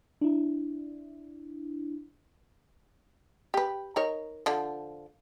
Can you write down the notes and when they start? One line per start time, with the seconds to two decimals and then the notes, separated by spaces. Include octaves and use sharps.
0.21 D4 E4
3.54 G4 B4
3.96 D#4 A#4 C#5
4.46 D3 F3